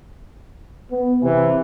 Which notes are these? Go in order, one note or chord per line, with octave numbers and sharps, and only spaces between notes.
B3
C3 E3